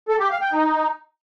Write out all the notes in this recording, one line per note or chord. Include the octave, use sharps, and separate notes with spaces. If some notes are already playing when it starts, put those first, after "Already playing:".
A4
G4
F5
G5
D#4